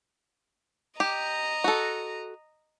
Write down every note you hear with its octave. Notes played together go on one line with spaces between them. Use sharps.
G4 D#5 A#5
F#4 A4